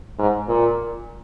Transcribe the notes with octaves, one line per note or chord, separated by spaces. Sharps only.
G#2
A#2